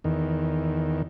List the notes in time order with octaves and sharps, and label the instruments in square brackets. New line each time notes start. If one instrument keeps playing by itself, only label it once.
[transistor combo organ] E2 D#3